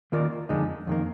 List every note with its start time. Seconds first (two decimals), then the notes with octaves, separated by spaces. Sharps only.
0.12 D#3 A#3 F4 A#4 D5
0.49 F2 D3 G#3 D#4
0.87 F2 D#3 A#3